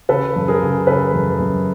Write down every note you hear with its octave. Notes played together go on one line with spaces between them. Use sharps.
C#3 A4 B4
F#2
G#4 A#4
C#3
C#3 A4 B4
F#2
F#2